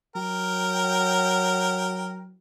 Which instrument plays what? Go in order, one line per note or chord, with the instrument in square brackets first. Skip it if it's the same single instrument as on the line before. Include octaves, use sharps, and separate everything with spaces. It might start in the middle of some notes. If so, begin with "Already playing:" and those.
[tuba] F#3 [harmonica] A#4 G5